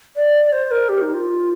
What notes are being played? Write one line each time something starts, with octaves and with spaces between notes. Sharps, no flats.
D5
C5
A#4
G4
D#4
F4